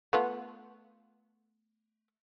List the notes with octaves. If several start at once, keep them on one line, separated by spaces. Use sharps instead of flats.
A3 B3 F4